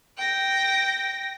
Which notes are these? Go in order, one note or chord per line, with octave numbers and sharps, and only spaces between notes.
G5 A#6